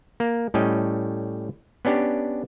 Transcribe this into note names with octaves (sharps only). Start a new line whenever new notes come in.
A#3
A2 G3 C#4 D#5
B3 C#4 D4 G4